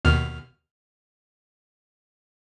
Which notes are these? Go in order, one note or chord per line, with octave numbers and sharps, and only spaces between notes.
D#2 B2 F6